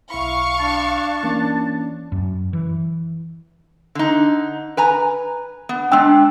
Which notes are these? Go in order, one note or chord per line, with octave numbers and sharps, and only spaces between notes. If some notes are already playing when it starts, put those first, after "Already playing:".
B1 E4 F5 B5 C#6
D4 A5
E3 A#3 C#4
F#2
E3
D3 D#4
B4 G#5 A#5
B3
G#3 D4 G5 E6